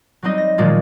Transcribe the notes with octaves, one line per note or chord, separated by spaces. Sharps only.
F#3 G3 C4 D#4 D#5
A#6
A#2 D#3 F3 F#3 G#3 F4